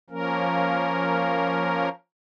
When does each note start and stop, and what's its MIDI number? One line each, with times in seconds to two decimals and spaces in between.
0.10 1.89 53
0.10 1.89 58
0.10 1.89 61
0.10 1.89 70